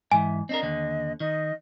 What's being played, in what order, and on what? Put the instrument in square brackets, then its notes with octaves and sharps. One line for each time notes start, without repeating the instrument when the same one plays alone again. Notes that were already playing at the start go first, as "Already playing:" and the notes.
[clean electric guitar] G#2 E3 [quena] E5 [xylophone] G#5
[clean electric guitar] C4 D4 A#4 [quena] D#5
[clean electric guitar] D#2 D3
[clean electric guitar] D#3 [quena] D#5